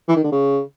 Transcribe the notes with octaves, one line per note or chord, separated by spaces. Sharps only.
E3
D#3
D3
C#3